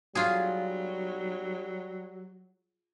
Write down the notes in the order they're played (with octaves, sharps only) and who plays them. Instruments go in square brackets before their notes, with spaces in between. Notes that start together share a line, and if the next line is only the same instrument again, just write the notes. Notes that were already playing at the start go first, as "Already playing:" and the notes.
[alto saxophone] F#3 [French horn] G3 [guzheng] F4 F#4 G#4